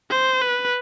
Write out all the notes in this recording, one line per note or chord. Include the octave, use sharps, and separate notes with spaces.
C5
B4